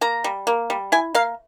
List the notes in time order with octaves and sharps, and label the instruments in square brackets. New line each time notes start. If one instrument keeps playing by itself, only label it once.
[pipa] A#3 A#5
G3
A#3
G3
E4 G#5
A#3 F5